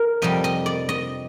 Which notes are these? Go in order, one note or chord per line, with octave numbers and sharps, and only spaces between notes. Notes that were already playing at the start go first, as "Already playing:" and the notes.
Already playing: A#4
F2 C3 G3 D#5
D#5
D5
D#5